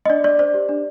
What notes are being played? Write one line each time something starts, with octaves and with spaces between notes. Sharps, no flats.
D#5
D4 D5
D4 D5
C5 D5
G4
D4